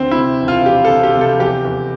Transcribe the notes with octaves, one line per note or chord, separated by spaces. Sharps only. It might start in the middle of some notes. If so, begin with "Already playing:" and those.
Already playing: D2 C4
E4
C3
E1
F4
E1 G4
A4
C3
G4
C3
A4
E2 G4
E2